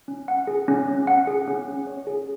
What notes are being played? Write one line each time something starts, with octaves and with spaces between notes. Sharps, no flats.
C#4
F#5
G#4
C#4
C#4
F#5
G#4
C#4
C#4
C#5
G#4